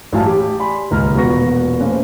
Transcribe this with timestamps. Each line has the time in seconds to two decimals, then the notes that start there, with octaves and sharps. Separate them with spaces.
0.12 A1 F#3 F5 A5
0.25 G4
0.59 D5 G#5 B5 C6
0.91 D#1 C#2 A#5 F6
1.15 E1 A#2 B3 F#4 C#6 A#6
1.80 A3 A#3 C#4 B4 C5